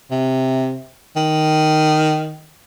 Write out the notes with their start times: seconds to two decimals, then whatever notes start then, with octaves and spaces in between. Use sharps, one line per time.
0.11 C3
1.16 D#3